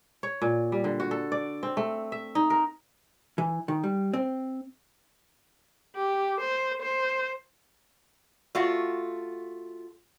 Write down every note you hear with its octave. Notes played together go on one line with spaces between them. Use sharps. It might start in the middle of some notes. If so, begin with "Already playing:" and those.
C#5
A#2
G3
D3
F#4
A4
D5
C4
A3
E5
D#4
A#4
E3
D#3
G3
C4
G4
C5
C5
A3 F4 F#4